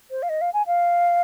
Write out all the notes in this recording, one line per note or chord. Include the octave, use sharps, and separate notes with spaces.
C5
F5
D#5
F5
G#5
F5